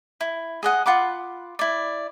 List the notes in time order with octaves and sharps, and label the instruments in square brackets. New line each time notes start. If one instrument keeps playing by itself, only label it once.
[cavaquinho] E4
G#4 D#5 F#5
F4 F#5 B5 D6
E4 D5